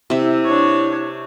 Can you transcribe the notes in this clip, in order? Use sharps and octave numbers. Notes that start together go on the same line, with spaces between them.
C3 E4 E5
D4 C#5